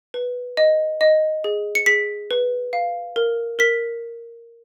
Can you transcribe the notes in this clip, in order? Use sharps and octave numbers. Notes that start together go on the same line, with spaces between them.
B4
D#5
D#5
G#4
C#7
G#4 B6
B4
F5
A#4
A#4 B6